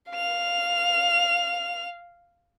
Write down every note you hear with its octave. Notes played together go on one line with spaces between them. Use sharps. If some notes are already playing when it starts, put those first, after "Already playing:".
F5 F7